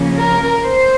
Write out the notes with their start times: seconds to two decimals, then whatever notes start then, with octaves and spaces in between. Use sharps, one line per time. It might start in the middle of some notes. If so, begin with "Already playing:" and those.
Already playing: C#3 F3 A#3 C#4
0.18 A#4
0.63 C5